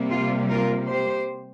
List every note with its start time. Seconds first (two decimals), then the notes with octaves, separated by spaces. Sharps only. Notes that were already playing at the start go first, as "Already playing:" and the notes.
Already playing: C3 G3 A#3
0.10 F4
0.49 F4 A#4
0.89 G4 C5